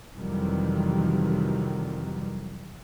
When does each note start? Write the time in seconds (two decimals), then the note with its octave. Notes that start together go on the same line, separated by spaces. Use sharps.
0.16 F2 C3 D#3 E3 F#3 G3